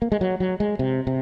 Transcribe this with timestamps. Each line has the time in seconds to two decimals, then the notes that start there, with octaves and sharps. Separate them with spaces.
0.02 A#3
0.12 G#3
0.21 F#3
0.40 F#3
0.60 G#3
0.79 C3
1.07 C3